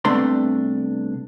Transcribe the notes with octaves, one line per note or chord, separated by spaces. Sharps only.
C2 C3 A3 B3 D4 C6